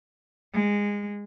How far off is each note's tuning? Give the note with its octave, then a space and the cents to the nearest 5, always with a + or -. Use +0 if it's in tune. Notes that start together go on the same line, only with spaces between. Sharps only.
G#3 -20